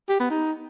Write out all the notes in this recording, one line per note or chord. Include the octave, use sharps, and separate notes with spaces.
G4
B3
D#4